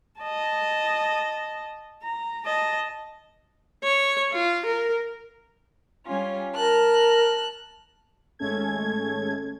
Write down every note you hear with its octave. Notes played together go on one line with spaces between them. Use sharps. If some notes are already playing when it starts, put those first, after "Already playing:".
D#5 A5
A#5
D#5 A5
C#5
F4
A#4
G3 C#4 F4
A#4 A5 F6 F#6
G#1 G#3 A3 C#4 A4 G#6